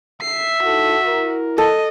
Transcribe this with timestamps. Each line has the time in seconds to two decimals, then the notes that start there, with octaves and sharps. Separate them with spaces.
0.21 E5 C7
0.64 D#4 E4 F#4 A4
1.06 E4 A#4
1.58 A4 D#5